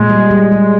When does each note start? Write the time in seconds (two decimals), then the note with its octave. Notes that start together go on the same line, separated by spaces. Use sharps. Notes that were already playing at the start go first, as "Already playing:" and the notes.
Already playing: A#2 G#3
0.10 G3
0.31 G3
0.52 G3